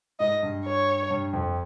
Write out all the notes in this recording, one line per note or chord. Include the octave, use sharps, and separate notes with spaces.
G#2 D#5
G2
C#5
G2
F2